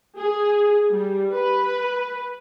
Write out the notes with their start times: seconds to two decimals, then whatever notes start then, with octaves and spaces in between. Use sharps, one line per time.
0.19 G#4
0.90 G3
1.32 B4